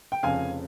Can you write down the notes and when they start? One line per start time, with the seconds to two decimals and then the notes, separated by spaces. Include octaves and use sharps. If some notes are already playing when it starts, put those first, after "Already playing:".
0.12 G5
0.23 F1 F2 C#3 F5 G#5